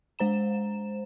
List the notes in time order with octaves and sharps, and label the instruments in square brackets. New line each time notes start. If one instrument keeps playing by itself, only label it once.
[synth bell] G#3 C5 A#5 E7